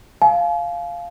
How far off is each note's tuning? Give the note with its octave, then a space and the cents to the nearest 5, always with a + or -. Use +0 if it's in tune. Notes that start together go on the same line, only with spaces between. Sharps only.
F5 +0 G#5 +45